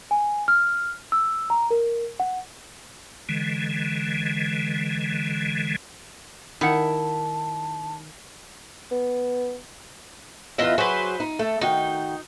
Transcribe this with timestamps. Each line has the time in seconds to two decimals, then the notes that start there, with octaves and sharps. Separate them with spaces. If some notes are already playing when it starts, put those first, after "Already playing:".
0.11 G#5
0.48 F6
1.12 E6
1.50 A#5
1.71 A#4
2.20 F#5
3.29 D3 E3 G#3
6.61 D#3 E4 F#5 A5
8.91 B3
10.58 E2 E3 F4 D#5 E5
10.78 F#3 F#4 G#4 B4 C5
11.20 D#4
11.39 A3 A4
11.62 D#3 D#4 F#4 G5